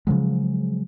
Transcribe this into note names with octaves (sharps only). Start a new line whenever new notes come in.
C#3 F3 F#3 G#3